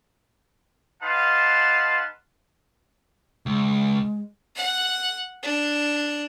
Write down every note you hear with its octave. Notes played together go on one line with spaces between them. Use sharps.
D#4 B4 F5 F#5 A5 C6
C#2 G#3
F#5
D4